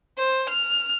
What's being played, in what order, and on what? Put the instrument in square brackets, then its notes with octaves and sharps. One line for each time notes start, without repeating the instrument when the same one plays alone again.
[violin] C5
F6